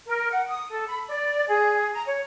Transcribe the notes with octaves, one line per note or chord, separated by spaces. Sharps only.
A#4
F#5
D#6
A4
B5
D5
G#4
A#5
C#5